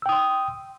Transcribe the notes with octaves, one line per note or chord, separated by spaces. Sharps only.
G5 C6 D#6 E6